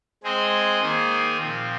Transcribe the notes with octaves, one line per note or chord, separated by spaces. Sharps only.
G#3 C4 G#4 C5 D#5
D#3 A#3 G#4 C5
A#2 F3 C4